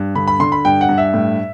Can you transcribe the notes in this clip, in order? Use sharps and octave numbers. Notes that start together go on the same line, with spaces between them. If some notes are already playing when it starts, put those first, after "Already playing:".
Already playing: G2
D3 B5
B5
D3 C6
B5
G2 G5
F#5
G2
E5
A2